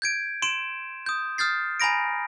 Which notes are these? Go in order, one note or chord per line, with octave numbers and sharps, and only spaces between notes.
G6 G#6 D7
C6 D7 E7
D#6 G6
D#6 F6 G6 A6 C7
G#5 A#5 B5 A#6 D7